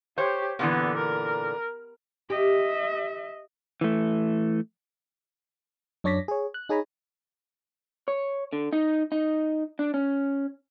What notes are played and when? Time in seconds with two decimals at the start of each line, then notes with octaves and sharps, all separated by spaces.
0.18 G4 C5 C#5
0.59 A#2 D3 E3 B3
0.97 A#4
2.30 G4 D#5 E5
3.81 E3 A3
6.04 F#2 D4 C#5 D5 A#6 B6
6.28 G#4 C#5
6.54 F#6
6.69 D#4 G#4 C#5 G#5 A#5 B5
8.08 C#5
8.53 D3
8.73 D#4
9.12 D#4
9.79 D4
9.94 C#4